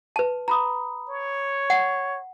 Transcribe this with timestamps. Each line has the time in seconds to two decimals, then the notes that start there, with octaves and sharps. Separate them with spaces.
0.16 B4 A5
0.48 A#5 B5 D#6
1.09 C#5
1.70 F#5